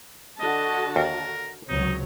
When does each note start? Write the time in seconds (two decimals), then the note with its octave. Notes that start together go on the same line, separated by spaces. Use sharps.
0.40 D3 F#4 D#5 A5
0.96 D#2 A#4
1.69 C#2 C3 F#3 D#4 C#5